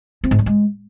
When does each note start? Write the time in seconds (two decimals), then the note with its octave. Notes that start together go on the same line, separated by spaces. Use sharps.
0.24 C4
0.31 G#2
0.39 G3
0.46 G#3